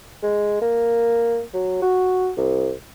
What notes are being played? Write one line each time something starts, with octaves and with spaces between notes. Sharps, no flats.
G#3
A#3
F#3
F#4
C2